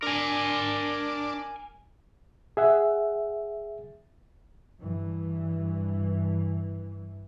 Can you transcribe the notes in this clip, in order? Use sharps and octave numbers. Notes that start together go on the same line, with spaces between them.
D4 A#4 G#5
G#4 E5 F#5
G2 E3